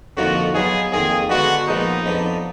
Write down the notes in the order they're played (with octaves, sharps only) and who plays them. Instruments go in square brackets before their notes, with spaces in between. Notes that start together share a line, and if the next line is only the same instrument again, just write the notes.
[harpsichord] F2 D3 F3 A#3 D#4 [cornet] F#4
[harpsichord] B2 F#3 B3 F4 [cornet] G#4
[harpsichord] F2 D#3 A#3 F4 [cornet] G#4
[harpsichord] D3 G#3 B3 D4 [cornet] F#4
[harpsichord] A#2 F3 G#3 B3 [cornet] D#4
[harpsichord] F2 F3 B3 D4